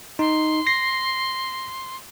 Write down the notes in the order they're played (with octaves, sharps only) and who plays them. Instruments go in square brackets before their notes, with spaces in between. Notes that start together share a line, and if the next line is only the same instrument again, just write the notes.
[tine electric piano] D#4 [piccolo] C6
[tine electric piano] A#6 C7